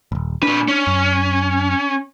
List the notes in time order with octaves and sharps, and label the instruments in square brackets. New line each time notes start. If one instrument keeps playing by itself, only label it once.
[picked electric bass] D#1 G#1
[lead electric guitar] A#2 B4 [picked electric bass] D4
[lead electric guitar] C#4
[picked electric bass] F#2